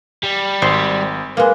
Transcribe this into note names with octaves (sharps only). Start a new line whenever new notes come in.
G3
G#1 C5
G#3 A#3 B4